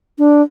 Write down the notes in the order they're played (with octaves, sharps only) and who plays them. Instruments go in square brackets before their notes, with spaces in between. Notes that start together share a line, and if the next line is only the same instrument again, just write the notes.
[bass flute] D4